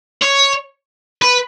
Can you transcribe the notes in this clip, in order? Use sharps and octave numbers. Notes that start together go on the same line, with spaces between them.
C#5
B4